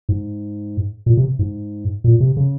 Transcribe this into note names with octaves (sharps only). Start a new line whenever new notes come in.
G#2
A#2
C3
G#2
A#2
C3
C#3